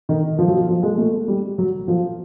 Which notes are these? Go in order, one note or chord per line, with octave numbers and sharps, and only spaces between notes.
D#3
F3
F#3
F3
F3
G#3
A3
G3
F#3
F3